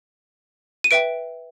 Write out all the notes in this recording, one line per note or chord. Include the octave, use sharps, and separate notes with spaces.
D#7
B4 E5 G5 D7